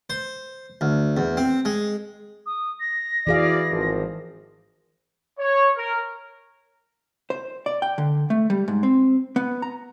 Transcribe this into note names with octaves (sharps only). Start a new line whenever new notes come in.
C5
D2
E2
C4
G#3
D#6
A#6
E3 F#4 G#4 D5 F5
G#1 F3
C#5
A#4
C5
D5
G5
D3
A3
G3
G#2
C4
B3
A#5